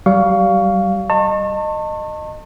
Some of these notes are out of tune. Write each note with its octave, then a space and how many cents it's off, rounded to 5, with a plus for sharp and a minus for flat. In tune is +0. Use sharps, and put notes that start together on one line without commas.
G3 -30 F5 +0 C#6 +20
D#5 -20 A5 +35 C#6 -35